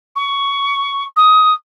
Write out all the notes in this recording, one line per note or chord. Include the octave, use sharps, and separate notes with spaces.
C#6
D#6